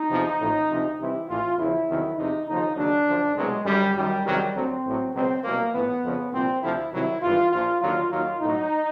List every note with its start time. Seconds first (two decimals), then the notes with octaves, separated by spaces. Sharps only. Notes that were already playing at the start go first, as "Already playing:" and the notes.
Already playing: D#4
0.09 E2 C3 F3
0.39 A1 A2 F3
0.69 D2 C3 F3
0.98 C2 C3 E3 E4
1.28 A1 A2 E3 F4
1.58 E2 C#3 F3 E4
1.88 E2 C3 D#3 F#3
2.17 E2 C3 F3 D#4
2.47 D#2 C#3 F3 D#4
2.76 D#2 C#3 F#3 D4
3.06 F#2 D3 F3
3.36 C2 B2 F#3 G#3
3.65 F#2 D3 F#3 G3
3.95 F#2 D#3 F#3 G3
4.24 E2 C3 D#3 F#3 G3
4.54 D2 D3 F#3 C4
4.84 A1 A2 F#3
5.14 C#2 B2 F#3 C4
5.43 C2 B2 F#3 A#3
5.73 A#1 A2 E3 B3
6.02 F2 C#3 F3
6.32 C2 A#2 F3 C4
6.62 D2 C3 F3 E4
6.92 C2 C3 D#3 F#3 E4
7.22 G#1 G2 E3 F4
7.51 A#1 A#2 F3 F4
7.81 D#2 D3 F#3 F4
8.10 D#2 D#3 F#3 F4
8.40 B1 A2 F#3 D#4